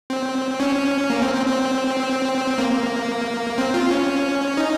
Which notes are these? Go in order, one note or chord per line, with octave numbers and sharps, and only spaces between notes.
C4
C#4
A#3
C4
C4
C4
A#3
C4
F4
C#4
D#4